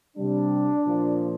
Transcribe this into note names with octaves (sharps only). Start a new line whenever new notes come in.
C3 G3 D4
A#2 F3